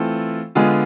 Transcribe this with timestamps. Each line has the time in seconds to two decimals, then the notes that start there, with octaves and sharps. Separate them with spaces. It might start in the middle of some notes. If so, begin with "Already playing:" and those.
Already playing: E3 A3 C4 F4 A4
0.55 D3 G#3 B3 F4 G#4